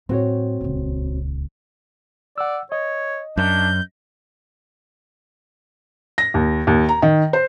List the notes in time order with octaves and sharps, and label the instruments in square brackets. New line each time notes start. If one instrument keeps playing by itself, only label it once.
[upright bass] A2 G3 [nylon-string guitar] C4 F#4 C#5
[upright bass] D#1 C#2
[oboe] D5 [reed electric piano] F#5 E6
[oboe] C#5 [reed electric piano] D#5
[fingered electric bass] F#2 [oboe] D4 [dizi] G6
[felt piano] A#6
D#2
D#2
A#5
D#3
C5